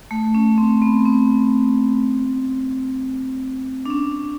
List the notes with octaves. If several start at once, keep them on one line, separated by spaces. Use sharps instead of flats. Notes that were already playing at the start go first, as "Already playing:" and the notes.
A3
C#4
C4
B3
C4
D4
C#4